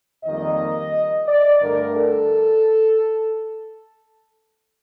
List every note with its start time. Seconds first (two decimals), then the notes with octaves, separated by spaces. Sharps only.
0.24 F2 D#3 G3 A#3 D#5
1.27 D5
1.62 G2 D3 A3 D4 A#4
1.96 A4